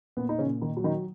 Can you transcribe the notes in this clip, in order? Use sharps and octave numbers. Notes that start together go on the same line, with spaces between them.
A#2 B3
D#4
C#3 C#4
A#2
D#3 D#4
F#3
D#3 D#4